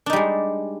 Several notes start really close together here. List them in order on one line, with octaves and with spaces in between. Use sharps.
D4 D#4 G3 G#3